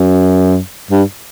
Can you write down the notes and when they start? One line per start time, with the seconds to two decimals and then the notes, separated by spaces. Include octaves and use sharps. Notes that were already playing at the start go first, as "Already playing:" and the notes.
Already playing: F#2
0.91 G2